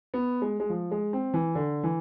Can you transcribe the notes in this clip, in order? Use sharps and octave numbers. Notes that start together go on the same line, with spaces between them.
B3
G#3
G#3
F3
G#3
C4
E3
D3
E3